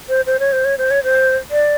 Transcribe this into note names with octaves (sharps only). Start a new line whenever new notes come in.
C5
C5
C#5
C5
C#5
C5
C#5
C5
D5